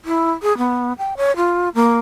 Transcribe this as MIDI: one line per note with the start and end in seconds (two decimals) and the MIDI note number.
0.05 0.32 64
0.42 0.56 68
0.58 0.93 59
0.98 1.14 79
1.17 1.35 73
1.36 1.69 65
1.75 1.99 58